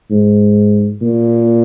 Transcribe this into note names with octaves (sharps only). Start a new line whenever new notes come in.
G#2
A#2